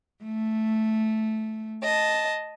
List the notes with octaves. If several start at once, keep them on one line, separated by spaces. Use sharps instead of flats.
A3
D#5 A5